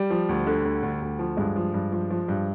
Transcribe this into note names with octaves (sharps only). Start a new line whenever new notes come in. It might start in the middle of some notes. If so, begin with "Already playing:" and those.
Already playing: G3
F3
D2
D3
D2
D2
D2
F3
G2 G#3
F3
G2
F3
F3
G2